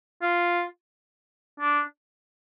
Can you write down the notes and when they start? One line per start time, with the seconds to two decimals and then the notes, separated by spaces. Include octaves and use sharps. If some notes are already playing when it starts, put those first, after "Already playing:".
0.22 F4
1.60 D4